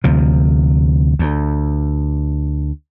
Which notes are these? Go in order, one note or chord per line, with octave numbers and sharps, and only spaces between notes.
D2 C3 F3
D2